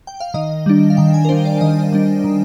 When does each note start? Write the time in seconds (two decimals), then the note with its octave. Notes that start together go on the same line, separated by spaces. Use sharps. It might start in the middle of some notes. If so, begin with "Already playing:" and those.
0.07 G5
0.20 F5
0.34 D#3 D#5
0.66 G3 D4
0.90 F5
0.97 D#3 G5
1.14 G#5
1.25 A#4
1.29 G3 D4 C5
1.45 D5
1.61 D#3 D#5
1.92 G3 D4
2.24 D#3